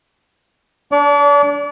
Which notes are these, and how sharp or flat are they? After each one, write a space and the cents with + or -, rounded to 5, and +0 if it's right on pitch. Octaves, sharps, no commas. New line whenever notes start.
D4 -20 D5 -40